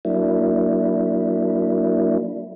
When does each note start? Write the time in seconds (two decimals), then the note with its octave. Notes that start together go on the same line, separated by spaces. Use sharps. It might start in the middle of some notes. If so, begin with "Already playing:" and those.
0.05 F#3 A#3 D4 E4